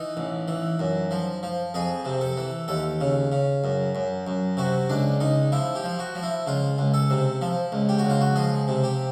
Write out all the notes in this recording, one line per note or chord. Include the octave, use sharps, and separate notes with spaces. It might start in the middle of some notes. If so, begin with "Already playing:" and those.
Already playing: E3 D#4
A1
E3
F#2
F3
F3
F2 G#4
C3
A4
E3
D#2 A4
C#3
C#3
F#2
F#2
F#2
C3 F#4
C#2 D4
C#2 D#4
F3 E4
G4
F3
F#4
F3
E4
C#2 F4
C#2
A4
C3
F3
C#2
G4
F#4
C#2
F4
F#4
F3 G#4
C3
G4